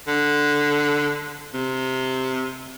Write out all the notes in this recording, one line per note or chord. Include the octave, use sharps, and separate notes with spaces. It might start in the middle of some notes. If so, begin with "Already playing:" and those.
D3
C3